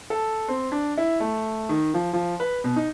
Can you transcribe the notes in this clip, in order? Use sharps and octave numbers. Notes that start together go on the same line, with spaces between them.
A4
C4
D4
E4
A3
D#3
F3
F3
B4
B2
D#4